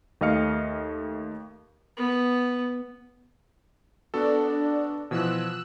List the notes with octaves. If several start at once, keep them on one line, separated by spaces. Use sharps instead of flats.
D#2 A3 D#5 F5 F6 C#7
B3
B3 D4 F#4 A4
B2 E3 F3 E6 F#6